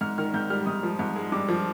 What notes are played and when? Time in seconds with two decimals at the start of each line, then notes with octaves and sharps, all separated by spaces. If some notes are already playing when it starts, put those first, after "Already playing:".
0.01 G#2 F6
0.18 D#3 F6
0.34 G#2 G6
0.50 G3 F6
0.66 G#2 D#6
0.83 F3
0.99 G#2
1.16 G#3
1.32 G2 D6
1.48 F3